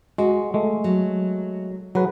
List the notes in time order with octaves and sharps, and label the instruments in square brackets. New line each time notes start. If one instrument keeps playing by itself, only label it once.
[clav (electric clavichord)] G#3 [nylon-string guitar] F#4
[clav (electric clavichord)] G#3 A3
[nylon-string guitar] F#3
[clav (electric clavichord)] F#3 B4 [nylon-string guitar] G#4